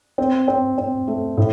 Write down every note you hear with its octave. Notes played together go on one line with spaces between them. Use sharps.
C4
C4
C4
A3
A2